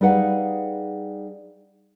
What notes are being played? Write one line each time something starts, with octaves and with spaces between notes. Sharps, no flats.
G3 D#4 G#4 B4 F5 F#5